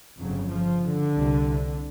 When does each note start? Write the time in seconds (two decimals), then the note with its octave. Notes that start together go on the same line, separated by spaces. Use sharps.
0.21 G1 F2 C#3 F#3
0.52 F3
0.84 D3
1.16 C2 C3